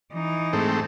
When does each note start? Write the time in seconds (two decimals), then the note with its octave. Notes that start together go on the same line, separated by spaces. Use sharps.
0.13 E3 D#4
0.53 G#2 A3 C4